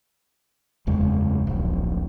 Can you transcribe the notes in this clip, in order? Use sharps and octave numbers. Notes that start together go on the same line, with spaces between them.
F#1 E2 C#3 G#3
D1 A#1